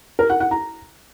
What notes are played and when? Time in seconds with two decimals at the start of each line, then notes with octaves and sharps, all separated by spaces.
0.19 A#4
0.30 F#5
0.40 F#5
0.51 A#5